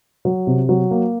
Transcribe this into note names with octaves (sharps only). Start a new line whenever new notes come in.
F#3
C3
F#3
A#3